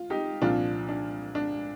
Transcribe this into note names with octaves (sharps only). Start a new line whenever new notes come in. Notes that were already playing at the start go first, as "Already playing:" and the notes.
Already playing: F4
D#4 G4
C2 A#2 F3 D4 F4
D4
D4